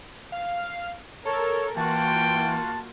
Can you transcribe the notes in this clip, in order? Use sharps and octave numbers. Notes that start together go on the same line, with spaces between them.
F5
A4 A#4 C#5
E3 A#3 F4 F#4 G5 A5